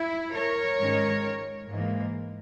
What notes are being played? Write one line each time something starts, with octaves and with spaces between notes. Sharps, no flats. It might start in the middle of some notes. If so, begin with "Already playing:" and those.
Already playing: E4
A#4 C#5
G#2 D#3 G#3 C#4
G#2 E3 A#3